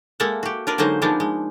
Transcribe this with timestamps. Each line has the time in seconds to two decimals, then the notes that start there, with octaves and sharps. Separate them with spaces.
0.20 G#3 A#3 A4 E5 F#5
0.43 F#4 G4
0.67 D4 F4 A#4 B4 D5
0.78 D3 F#3 G#3 A#3 D#4 C5
1.02 F3 G#3 A#3 B3 D4 D#4
1.20 G#3